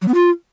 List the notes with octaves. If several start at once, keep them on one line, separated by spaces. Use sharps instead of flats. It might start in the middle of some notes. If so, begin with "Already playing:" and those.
F#3
B3
F4